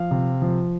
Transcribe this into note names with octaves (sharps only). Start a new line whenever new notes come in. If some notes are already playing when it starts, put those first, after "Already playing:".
Already playing: F3 F5
C3
F3